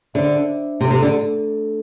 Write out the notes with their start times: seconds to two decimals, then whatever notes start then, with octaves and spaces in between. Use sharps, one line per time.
0.14 D3 D4 C5 E5
0.80 C3 A3 D4 A4
0.91 C3
1.02 D3